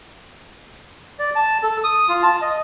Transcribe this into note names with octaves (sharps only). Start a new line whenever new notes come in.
D5
A5
A4
D#6
F4
A5
D#5